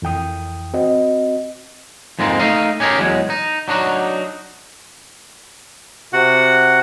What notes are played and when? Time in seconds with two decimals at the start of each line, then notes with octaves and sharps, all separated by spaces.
0.02 F2 E3 G5 D#6
0.74 C4 F#4 D#5
2.19 F2 G#2 G#3 A#3 C4
2.39 A3 D#4 D#5 F5
2.80 C#4 G4 G#4 A#4
2.99 E2 F#3 G#3
3.30 D#4
3.68 F#3 D4 D#4 F#4
6.13 C3 F#4 F#5